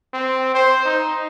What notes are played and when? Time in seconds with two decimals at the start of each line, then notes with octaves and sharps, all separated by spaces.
0.14 C4
0.55 C5
0.85 D#4